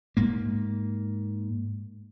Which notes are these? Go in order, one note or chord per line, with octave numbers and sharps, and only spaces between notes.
G#2 A#3